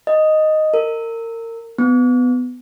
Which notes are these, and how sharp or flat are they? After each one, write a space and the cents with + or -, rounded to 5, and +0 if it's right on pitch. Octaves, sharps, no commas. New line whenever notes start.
D#5 +0
A#4 -30
B3 +15